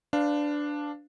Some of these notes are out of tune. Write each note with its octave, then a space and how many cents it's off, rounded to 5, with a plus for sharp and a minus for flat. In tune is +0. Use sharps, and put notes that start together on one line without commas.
D4 +0 B4 +35 F5 +0